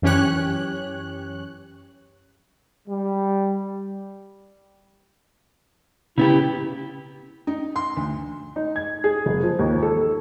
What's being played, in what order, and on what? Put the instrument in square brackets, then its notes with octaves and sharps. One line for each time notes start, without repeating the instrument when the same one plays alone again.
[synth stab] F#2 E3 C#4 G4 C#5 F#6
[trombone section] G3
[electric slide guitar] C#3 B3 G4 [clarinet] E4
[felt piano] D#4
C6
D2
[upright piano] D#4
G#6
G#4
F#1
F3
D#2
A4